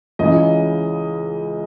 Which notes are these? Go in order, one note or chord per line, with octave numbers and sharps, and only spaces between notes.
C#2 C#3 E3 D#5